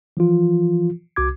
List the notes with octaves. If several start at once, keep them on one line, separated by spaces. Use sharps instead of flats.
E3 F3 F4
C2 F#4 D6 G#6